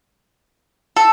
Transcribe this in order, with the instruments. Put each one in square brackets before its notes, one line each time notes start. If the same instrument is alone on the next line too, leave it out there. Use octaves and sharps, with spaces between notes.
[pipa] A4